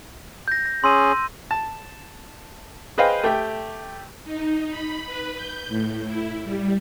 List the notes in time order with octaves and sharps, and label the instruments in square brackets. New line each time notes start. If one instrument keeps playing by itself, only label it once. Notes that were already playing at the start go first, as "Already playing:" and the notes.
[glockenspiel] G6 A#6
A#6
[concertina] C#4 G#4 [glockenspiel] C6 E6 D#7
[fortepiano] A5
G#4 B4 C5 D#5 F5 G5
A3 G4 G5
[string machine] D#4
B5
B4
G6
A2
E4
G3